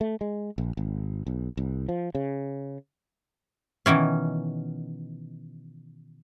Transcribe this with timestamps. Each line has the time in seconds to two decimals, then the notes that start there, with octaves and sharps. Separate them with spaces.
0.01 A3
0.21 G#3
0.58 A#1
0.77 G#1
1.27 B1
1.57 C2
1.89 F3
2.15 C#3
3.86 B2 D#3 E3 C#4